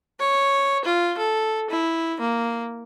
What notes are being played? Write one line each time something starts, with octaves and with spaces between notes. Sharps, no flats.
C#5
F4
A4
E4
A#3